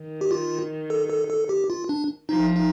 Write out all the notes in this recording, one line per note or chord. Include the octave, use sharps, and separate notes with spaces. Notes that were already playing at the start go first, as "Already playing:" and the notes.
Already playing: D#3
G4
F4
A4
A4
A4
G4
F4
D4
F3 D#4
D#4